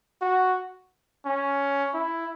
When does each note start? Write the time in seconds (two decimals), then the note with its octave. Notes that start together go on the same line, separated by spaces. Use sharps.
0.22 F#4
1.26 C#4
1.94 E4